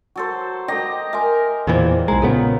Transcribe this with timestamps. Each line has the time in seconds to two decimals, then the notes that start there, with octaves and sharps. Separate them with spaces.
0.16 F#3 A4 C5
0.68 G4 A4 D#5 G5 A#5
1.13 A#4 E5 G#5 C6
1.67 E2 A#2 E3 C5 D#5
2.08 B1 G#3 A#5
2.22 A#2 C#3 B3 A4